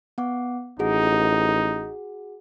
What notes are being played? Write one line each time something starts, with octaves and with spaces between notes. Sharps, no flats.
B3 F#5 D6
A1 D#4 F#4 G#4 F#5